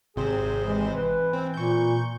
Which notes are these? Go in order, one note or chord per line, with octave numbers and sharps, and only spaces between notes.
G#1 C3 G#4 C5
E3 G#3
B4
C4
A#2 C#6 G6